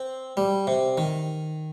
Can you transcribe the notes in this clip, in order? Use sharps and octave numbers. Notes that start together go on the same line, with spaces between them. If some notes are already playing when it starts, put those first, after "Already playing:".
Already playing: C4
G3
C3
D#3